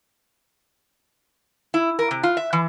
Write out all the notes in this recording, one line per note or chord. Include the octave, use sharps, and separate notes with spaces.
E4
A#4
C3
F4
E5
E3